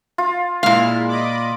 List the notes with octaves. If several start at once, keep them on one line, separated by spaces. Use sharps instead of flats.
F4
A#2 G#3 E4 F5
D#5 B5 D6